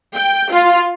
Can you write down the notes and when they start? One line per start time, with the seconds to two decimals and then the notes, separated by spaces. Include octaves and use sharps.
0.16 G5
0.52 F4